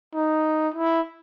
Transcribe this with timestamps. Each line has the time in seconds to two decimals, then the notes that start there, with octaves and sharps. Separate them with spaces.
0.15 D#4
0.74 E4